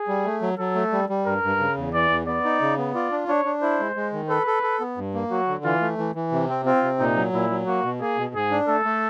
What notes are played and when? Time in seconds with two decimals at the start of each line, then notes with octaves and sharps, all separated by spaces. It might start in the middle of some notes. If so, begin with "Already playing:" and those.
Already playing: G#4
0.08 G3
0.25 A3
0.42 F#3
0.58 F#3 A4
0.75 A3
0.92 G3
1.09 G3
1.26 G2 A#4
1.43 G2
1.60 C#3
1.77 E2
1.94 E3 D5
2.10 E2
2.27 B3 D5
2.44 D#4
2.62 C#3
2.78 B3
2.95 F4 D5
3.12 D4
3.28 D4 C#5
3.45 D4
3.62 E4 C5
3.79 G#3
3.96 G#3
4.13 D#3
4.29 A4 B4
4.47 A4
4.63 A4
4.80 B3
4.97 G2
5.14 A#3
5.31 F#3 F#4
5.48 D3
5.64 E3 F4
5.81 A3
5.98 E3
6.15 E3
6.32 C3
6.49 C4
6.65 C4 F4
6.83 C3
6.99 A#2 D#4
7.16 F#3
7.33 A#2 E4
7.50 F#3
7.67 A#3 F#4
7.84 B2
8.00 A#3 G#4
8.17 B2
8.34 G#2 G#4
8.51 D4
8.68 A3 A4
8.85 A3